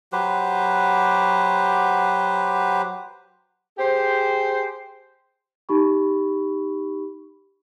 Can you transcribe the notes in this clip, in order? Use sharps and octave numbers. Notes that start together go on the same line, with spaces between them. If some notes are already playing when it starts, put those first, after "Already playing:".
F#3 G4 B4 C5
G4 G#4 C5
D#4 G4 B5 C#6